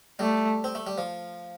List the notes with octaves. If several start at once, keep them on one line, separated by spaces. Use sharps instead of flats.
G3 A3
C4
A3
G3
F3